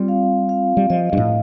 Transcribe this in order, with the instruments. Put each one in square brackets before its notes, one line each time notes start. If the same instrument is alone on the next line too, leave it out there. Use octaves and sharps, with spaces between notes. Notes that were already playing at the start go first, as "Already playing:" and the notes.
Already playing: [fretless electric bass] G3 [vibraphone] C4 F4
[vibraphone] F5
F5
[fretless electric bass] G3
[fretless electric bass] F3 [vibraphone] D#5
[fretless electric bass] G2
A2